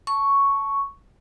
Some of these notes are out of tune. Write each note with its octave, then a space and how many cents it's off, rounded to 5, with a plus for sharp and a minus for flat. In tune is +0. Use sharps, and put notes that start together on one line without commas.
A5 +0 C#6 +0